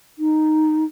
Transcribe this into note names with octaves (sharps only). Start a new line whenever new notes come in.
D#4